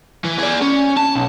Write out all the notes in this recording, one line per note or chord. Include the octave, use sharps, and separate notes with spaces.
E3
G#4 D5
C#4
A5
B1